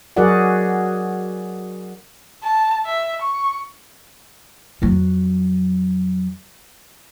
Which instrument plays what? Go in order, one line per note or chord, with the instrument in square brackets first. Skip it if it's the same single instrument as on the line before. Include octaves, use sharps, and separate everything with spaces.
[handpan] F#3 F#4 G#4 A#4 D5 F#5
[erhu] A5
E5
C#6
[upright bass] F2 F#3